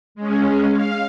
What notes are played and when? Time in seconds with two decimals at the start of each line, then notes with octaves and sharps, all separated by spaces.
0.15 G#3 C#4
0.71 F5